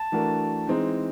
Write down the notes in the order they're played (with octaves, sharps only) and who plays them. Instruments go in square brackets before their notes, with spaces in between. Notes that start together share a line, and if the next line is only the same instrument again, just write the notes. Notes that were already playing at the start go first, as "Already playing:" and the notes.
Already playing: [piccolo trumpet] A5
[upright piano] E3 A3 D4 F#4 A#4
E3 G#3 C4 D#4